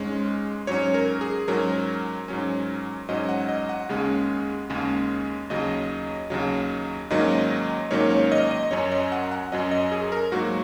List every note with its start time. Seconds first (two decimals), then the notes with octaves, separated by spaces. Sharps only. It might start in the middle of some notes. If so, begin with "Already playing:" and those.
Already playing: G#2 G#3 C#4
0.67 G#2 F#3 C#4 C#5
0.94 A#4
1.21 G#4
1.48 G#2 F#3 C#4 A#4
2.28 G#2 F#3 C#4
3.09 G#2 F#3 C#4 D#5
3.29 F#5
3.49 D#5
3.69 F#5
3.89 D#2 C#3 G#3 C#4
4.70 D#2 C#3 G#3 C#4
5.50 D#2 C#3 F#3 D#5
6.30 D#2 C#3 F#3
7.10 G#2 D#3 F#3 A#3 C#4 D#5
7.91 G#2 D#3 F#3 A#3 C#4 C#5
8.11 C#5
8.32 D#5
8.51 D#5
8.71 F#2 F#3 C#4 C#5
8.92 D#5
9.12 F#5
9.31 F#5
9.52 F#2 F#3 C#4 D#5
9.71 D#5
9.92 G#4
10.12 A#4
10.32 G#2 F#3 A#3 F#4